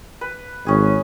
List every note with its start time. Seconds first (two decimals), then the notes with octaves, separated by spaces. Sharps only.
0.21 B4
0.66 G#1 C#4 G#4